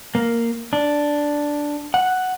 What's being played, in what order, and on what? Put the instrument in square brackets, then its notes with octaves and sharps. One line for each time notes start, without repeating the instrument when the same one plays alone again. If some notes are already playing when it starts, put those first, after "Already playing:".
[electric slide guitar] A#3
D4
F#5